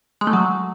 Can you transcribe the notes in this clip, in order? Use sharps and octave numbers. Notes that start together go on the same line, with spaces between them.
G#3
A3
F#3